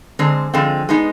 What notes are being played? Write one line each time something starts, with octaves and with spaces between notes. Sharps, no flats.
D3 G#3 C4
D3 F3 G#3 C4
G#3 B3 D#4